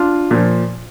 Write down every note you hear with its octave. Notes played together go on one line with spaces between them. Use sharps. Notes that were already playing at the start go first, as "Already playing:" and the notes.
Already playing: D4 F4
A#2 F3